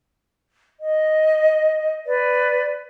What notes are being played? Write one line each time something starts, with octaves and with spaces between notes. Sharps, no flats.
D#5
B4 D5